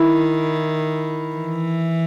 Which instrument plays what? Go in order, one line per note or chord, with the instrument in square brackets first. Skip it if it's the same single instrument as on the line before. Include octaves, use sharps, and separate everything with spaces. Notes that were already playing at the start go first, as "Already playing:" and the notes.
Already playing: [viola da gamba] D#3 [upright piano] E4
[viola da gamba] E3